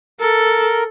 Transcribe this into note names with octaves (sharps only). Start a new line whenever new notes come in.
A4 A#4